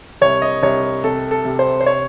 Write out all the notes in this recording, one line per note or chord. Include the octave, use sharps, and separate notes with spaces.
C2 C#5
D#5
C2 C#5
C3 A4
A4
C3
C5
C5
C#5